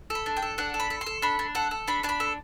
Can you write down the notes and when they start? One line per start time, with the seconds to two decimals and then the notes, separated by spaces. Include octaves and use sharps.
0.10 A4
0.15 B5
0.26 D4
0.37 G5
0.42 A4
0.58 D4 F#5
0.74 A4
0.80 B5
0.90 A4
1.01 C6
1.06 A4
1.22 D4 B5
1.39 D4
1.55 A4 F#5
1.71 A4
1.87 D4 B5
2.03 D4 A5
2.09 B5
2.20 A4